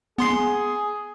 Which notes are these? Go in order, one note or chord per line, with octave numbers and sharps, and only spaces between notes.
B3 G#4 C6 C7